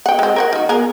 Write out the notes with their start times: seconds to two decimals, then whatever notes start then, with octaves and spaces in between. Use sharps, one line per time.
0.06 F#5 G5
0.19 G#3 C4
0.36 A#4 C5 F#5
0.53 D#3 F#4
0.69 B3 G#4 A#4